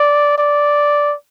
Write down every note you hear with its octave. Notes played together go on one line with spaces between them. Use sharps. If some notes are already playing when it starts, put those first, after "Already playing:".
Already playing: D5
D5